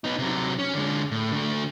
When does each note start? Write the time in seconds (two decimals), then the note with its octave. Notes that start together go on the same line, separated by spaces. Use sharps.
0.04 B3 D#4
0.18 C3 F#3
0.59 C#4
0.75 D3 G#3
1.11 A2
1.32 D3 A3